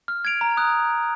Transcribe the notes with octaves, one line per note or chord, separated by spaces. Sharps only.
F6
G#6 D7 F7
A#5
D#6 F#6